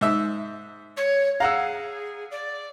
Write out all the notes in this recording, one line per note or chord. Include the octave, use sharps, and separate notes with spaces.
G#2 E5
C#5
G#4 F5 F#5 A#5 E6
D5